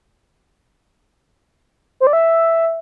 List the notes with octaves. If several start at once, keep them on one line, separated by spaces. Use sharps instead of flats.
C5
D5
E5